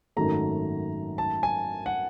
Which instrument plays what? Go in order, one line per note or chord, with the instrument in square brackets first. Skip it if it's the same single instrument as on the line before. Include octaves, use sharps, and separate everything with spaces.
[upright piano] G#1 F#2 D#3 F#3 A3 [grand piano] A#5
[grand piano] A5
G#5
F#5